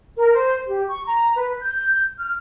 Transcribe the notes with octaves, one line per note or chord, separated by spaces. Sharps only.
A#4
C5
G4
C#6
A#5
B4
G6
F6